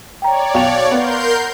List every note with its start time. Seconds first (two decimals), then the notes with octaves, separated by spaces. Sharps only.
0.22 C#5 D5 G5 A#5
0.54 B1 F5 G5 F7
0.91 B3 A#4 C6 G6